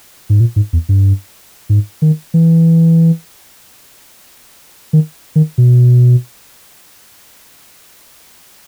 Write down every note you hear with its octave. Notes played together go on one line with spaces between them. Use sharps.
G#2
A#2
G#2
E2
G2
G#2
D#3
E3
D#3
D#3
B2